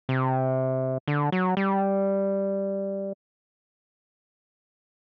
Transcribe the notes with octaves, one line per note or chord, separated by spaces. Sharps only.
C3
D3
F#3
G3